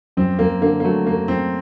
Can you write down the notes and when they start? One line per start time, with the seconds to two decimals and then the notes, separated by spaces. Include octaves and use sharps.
0.17 F#2 C4
0.39 F#2 A#3
0.62 D3 A#3
0.80 A#3
0.84 F#3 A3
1.07 F#2 A#3
1.28 F#2 C4